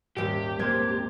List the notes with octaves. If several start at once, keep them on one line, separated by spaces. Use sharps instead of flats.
D#1 G#2 G4 D7
G#3 A#3 C4 G#6